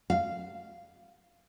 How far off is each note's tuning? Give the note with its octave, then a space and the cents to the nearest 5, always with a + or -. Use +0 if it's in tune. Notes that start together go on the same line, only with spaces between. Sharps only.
F5 -15